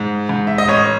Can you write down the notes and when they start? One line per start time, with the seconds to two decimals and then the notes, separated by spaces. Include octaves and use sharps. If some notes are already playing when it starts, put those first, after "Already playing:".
Already playing: G#2
0.29 G#2
0.47 E5
0.58 D#5
0.68 A1 C#5